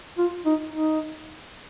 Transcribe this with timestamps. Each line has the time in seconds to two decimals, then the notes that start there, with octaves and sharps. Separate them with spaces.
0.18 F4
0.46 D#4
0.74 D#4